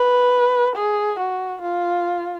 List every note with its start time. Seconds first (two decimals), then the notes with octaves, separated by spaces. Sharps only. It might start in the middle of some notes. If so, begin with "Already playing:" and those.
Already playing: B4
0.76 G#4
1.19 F#4
1.62 F4